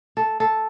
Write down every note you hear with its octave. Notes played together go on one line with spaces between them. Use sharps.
A4
A4